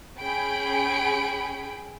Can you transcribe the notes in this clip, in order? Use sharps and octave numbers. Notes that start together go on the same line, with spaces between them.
C#4 G#4 G5 B5 D7